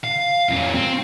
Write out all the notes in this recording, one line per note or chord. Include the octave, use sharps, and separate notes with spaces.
F5
F2 C#4
C4